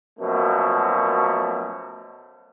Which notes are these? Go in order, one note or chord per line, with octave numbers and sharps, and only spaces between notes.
F#2 B2 F3 A3 A#3